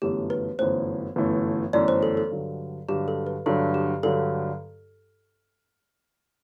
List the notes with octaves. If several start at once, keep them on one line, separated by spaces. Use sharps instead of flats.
G1 F#2 E3 A3 G4
B4
G1 F#2 E3 A3 C5
G1 F#2 E3 A3
G1 F#2 E3 A3 D5
C5
A4
A4
G2 D3 F#3
G2 D3 F#3 G4
A4
B4
G2 D3 F#3 A4
G4
G2 D3 F#3 A4